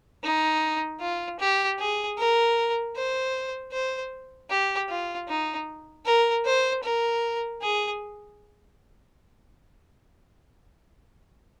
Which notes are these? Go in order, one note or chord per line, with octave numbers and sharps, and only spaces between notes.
D#4
F4
G4
G#4
A#4
C5
C5
G4
F4
D#4
A#4
C5
A#4
G#4